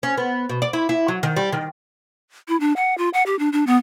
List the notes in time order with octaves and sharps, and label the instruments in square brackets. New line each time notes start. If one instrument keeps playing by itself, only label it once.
[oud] C#4
B3
B2
D5
E4
E4
F#3
D#3
G3
D#3
[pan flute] E4
D4
F#5
F4
F#5
G4
D4
D4
B3